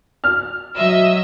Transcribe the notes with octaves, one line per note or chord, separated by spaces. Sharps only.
F6
F#3 D#5 E5 E6